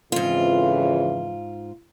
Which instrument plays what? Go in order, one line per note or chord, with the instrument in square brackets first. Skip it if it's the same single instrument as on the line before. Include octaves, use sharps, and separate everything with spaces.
[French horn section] F2 C#3 E3 [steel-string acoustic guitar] G#2 F4